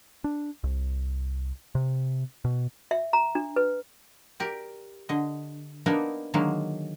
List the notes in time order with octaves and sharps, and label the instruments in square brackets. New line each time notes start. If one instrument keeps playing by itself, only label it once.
[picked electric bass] D4
C2
C3
B2
[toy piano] E5
A#5
D4
B4
[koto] G4 A#4 D5
D3 D#5
A#3 B3 D4 D#4 A#4
D3 D#3 F#3 G#3 A#3 F5